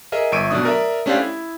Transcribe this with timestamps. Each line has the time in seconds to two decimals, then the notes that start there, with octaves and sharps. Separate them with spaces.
0.12 G#4 A#4 D#5 E5
0.32 G1 E5 C#6 D7 D#7
0.51 B2 F#3 A3 D4 D#6
0.65 A#4 D5 E5
1.06 A3 C#4 D4 G4 C5 F5
1.19 E4